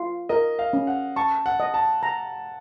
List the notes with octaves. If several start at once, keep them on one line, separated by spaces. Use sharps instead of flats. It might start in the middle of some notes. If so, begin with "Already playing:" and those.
Already playing: F4
A#4 D#5
F5
C#4
F#5
A5 C#6
F#5
D#5
A5
A#5